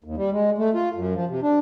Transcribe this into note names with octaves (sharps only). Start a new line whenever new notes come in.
D#2
G3
G#3
A3
F4
F#2
F3
C3
D4